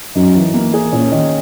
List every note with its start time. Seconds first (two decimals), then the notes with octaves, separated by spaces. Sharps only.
0.15 F#2 D#4
0.34 E3
0.54 A#3
0.74 G#4
0.92 A#2 C#4
1.12 D#3